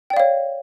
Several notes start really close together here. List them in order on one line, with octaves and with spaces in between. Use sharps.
G5 D5 F5 C#5